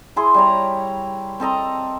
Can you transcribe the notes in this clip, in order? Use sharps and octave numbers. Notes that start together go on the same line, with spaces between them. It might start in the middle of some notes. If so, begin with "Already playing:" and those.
E4 G#4 C6
G3 C#5 A#5
C4 A4 D#5 A#5